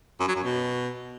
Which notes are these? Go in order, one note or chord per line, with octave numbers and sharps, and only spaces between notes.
F#2
F#3
F#2
B2